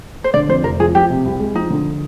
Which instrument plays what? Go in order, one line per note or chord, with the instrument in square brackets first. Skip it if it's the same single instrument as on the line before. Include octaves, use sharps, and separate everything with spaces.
[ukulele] C5
[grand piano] D3 [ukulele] D5
[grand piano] F2 [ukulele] C5
[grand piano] F1 [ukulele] A#4
[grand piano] F3 [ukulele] G#4
[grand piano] F3 [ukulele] G4
[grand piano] C3
C2
G#3
[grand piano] F3 [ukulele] D#4
[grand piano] D3